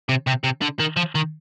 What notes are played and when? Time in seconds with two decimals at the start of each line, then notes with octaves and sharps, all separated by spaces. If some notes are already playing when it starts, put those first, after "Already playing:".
0.09 C3
0.27 C3
0.44 C3
0.62 D3
0.80 D#3
0.97 F3
1.15 D#3